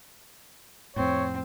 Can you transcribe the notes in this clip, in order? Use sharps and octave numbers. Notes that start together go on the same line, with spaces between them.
F2 A2 C4 C#5